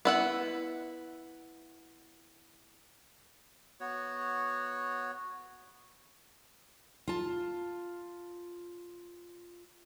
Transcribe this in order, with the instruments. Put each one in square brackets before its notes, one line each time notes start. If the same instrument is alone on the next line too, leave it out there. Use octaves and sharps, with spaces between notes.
[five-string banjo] B3 E4 F#5
[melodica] B3 F#4 C#5
[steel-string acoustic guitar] F4 A5